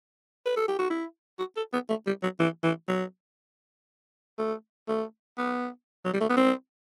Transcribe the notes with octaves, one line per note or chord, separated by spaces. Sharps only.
B4
A4
G4
F#4
E4
F#4
A4
B3
A3
G3
F#3
E3
E3
F#3
A3
A3
B3
F#3
G3
A3
B3
C4